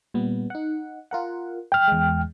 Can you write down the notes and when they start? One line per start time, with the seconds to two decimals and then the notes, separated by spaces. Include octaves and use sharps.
0.14 A#2 G3 B3
0.50 D#4 F#5
1.11 F4 A#4 F#5
1.72 G5 F6
1.88 E2 G#3